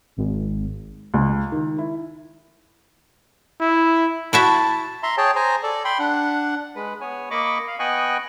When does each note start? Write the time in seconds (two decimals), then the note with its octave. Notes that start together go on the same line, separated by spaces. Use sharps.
0.17 G#1
1.14 C#2
1.52 D#3
1.78 E4
3.60 E4
4.33 E4 F#4 E5 A5
5.03 E5 A#5 C6
5.18 G#4 C#5 G5 A5
5.36 C5 G#5 A#5
5.63 A4 D5
5.85 G5 B5 C6
5.99 D4 F#5
6.76 G#3 B4
7.01 B3 C#5 G#5
7.31 A#3 D#5 B5 C#6 D6
7.67 F5
7.79 B3 D#5 G5 G#5 C#6 F#6